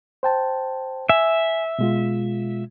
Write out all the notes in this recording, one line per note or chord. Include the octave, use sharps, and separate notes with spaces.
C5 G5 A5
E5 G#5
B2 G#3 F4